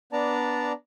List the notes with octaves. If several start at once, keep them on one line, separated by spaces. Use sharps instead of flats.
B3 D4 D5 A5 A#5